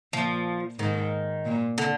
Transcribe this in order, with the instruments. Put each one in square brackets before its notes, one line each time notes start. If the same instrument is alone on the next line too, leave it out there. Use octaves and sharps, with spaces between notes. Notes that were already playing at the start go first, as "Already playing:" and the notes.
[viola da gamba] A#2 [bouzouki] F3
[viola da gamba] G#2 [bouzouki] D#3
[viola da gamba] A#2
[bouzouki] D3